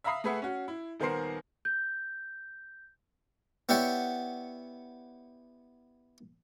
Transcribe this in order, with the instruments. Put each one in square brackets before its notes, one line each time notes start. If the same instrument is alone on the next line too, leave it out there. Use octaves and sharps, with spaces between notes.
[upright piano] E5 F5 A#5 B5 D#6 C7
A3 G#4 B4 E5 F#5
C#4 F#4
E4
D#1 D#3 B3 A#4 C5 C7
[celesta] G6
[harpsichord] B3 E4 G4 C#5 D5 F#5